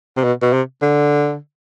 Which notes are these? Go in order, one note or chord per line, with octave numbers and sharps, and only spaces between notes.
C3
B2
B2
C3
D3